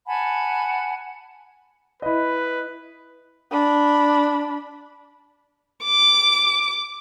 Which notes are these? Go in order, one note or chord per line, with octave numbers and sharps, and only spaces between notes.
F#5 G#5 A5 B5
E4 B4 D#5
D4 B5
D6